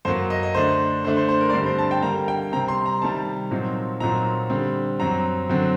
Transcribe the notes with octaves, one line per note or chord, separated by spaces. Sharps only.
F#2 F#3 A#3 C5
D#5
D#5
D3 A3 D4 C5
D3 A3 D4 C5
C5
C5
A#4
D5
G2 D3 G3 C4 C5
C5
A5
G5
D3 G3 A#3 A#5
G5
C3 G3 C4 A#5
C6
A#5
C3 D#3 G3 A5
A#2 F#3 C4 D#4
A#2 F#3 C4 D#4 A#5
D3 G3 C4
F#2 F#3 C4 A#5
F#2 D3 F#3 C4